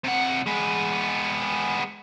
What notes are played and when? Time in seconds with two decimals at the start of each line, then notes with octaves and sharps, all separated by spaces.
0.04 C3 F#5
0.47 G#3 B3